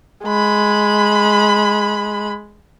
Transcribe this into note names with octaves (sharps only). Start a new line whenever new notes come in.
G#3 B5